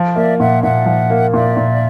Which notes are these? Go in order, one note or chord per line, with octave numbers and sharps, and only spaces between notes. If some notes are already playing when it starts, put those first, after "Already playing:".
Already playing: F3
A#3 D5 E5
A#2 E5 F#5
A#2 E5 F#5
F3
A#3
A#2 D5 E5
A#2